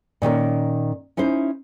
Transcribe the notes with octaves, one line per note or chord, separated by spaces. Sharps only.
A#2 D#3 C#4 A#4
C#4 D#4 E4 C5